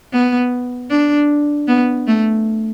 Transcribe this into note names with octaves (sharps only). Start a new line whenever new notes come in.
B3
D4
B3
A3